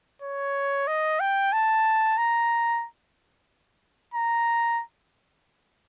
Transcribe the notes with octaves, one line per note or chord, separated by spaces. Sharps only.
C#5
D#5
G5
A5
A#5
A#5